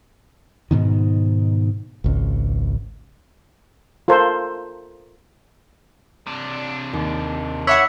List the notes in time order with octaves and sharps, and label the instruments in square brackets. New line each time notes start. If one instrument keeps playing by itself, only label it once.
[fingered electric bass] G#2 B2 D#3
G#1 C#2
[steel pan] F4 A4 A#4 C5
[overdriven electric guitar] C3 D4
[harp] D#2
[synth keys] C#5 E5 F#5 [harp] B5 D6 F#6 [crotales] E6 B6